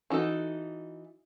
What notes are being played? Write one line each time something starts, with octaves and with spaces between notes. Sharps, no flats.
E3 D#4 F#4 A4